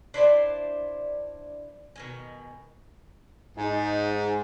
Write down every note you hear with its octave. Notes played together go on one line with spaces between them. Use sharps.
D4 E4 C5 D5
B2 D#3 G#5
G#2 D#4